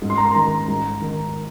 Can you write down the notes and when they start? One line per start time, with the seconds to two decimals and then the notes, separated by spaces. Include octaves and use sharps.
0.02 G#2
0.10 C6
0.18 A#5
0.26 C6
0.35 D#3 A#5
0.68 G#2
1.02 D#3